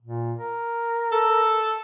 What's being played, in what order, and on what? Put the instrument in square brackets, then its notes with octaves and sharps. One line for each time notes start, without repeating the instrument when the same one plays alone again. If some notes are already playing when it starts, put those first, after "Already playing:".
[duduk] A#2
A#4
[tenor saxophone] A4